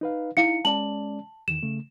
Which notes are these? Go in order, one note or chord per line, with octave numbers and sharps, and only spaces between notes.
D#4 B4 F5
D#4 E4 F5 C#7
G#3 C#4 D5 A5 F#7
E2 D#3 E7
C#3 A3